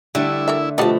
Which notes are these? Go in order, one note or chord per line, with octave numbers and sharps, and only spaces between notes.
D3 G3 A3 E4
A4 A#4 E5
B2 F3 G3 A3 D#5 F#5 A5